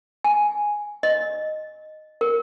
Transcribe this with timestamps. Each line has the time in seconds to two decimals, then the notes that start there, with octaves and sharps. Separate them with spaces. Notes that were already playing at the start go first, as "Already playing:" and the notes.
0.24 G#5
1.03 D#5
2.21 A#4